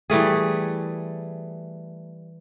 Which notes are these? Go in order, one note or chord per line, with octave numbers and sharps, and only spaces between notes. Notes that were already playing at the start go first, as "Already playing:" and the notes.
E3 G3 A3 G#4